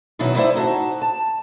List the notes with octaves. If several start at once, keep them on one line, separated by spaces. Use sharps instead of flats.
B2 D#3 F#3 D#4 E4 F#4
A3 E4 C5 D5 E5
D#4 F#4 A5
A5